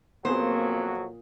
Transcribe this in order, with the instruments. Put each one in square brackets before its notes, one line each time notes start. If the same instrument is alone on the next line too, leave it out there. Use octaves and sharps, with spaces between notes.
[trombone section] F2 F#3 F#4 [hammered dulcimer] A#2 [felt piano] B3 C4 G#4 [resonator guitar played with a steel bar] C5